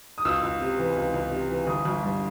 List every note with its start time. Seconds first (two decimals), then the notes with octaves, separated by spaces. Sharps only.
0.18 D#6
0.25 C#2 E6
0.43 C#2
0.61 C3
0.78 E3
0.96 C#2
1.14 C#2
1.31 C3
1.50 E3
1.67 G1 D#6
1.85 G1
2.03 G2